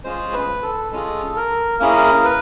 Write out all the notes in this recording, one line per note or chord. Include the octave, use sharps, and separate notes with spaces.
G#3 C#4 F4 G#4 C5
B4
A4
G#3 C#4 F4 G#4 A4
A#4
A#3 C#4 E4 G#4 A#4
B4